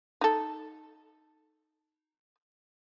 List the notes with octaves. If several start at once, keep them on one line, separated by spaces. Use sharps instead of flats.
D#4 A4